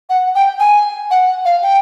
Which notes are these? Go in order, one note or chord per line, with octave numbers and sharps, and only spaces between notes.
F#5
G5
G#5
F#5
F5
G5